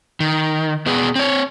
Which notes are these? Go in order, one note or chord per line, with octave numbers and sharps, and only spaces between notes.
D#3
B2 B3 G#4
C4 C#5